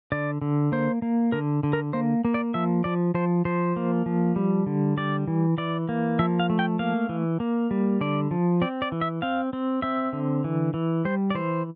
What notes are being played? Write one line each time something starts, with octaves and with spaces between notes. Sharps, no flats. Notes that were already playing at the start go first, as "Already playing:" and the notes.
D3 D5
D3
A#3 C5
A#3
D3 A#4
D3
A#4
A#3 C5
A#3
D5
F3 E5
F3 D5
F3 C5
F3 C5
A#3
F3
G3
D3
G3 D5
E3
E3 D5
A#3
F3 E5
F5
A3
G5
A#3 F5
E3
A#3
G3
D3 D5
F3
C4 D5
D5
E3
E5
C4 F5
C4
C4 E5
D3
E3
E3
G3 C5
D5
E3 C5